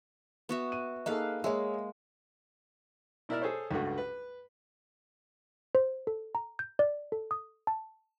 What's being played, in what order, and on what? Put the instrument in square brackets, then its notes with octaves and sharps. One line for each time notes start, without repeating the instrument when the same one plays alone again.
[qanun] B3 F#4 E5
[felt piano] D#7
[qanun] A#3 B4 F5 [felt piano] D#4 G#4 A4
[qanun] G#3 A#3 [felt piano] G#4 C#5 E5
[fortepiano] B2 E4 A#4 D5 E5 F6
G#4 A4 C5 C#5
C#2 G2 A3 F#4
B4
[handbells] C5
A4
A#5
G6
D5
A4
D#6
A5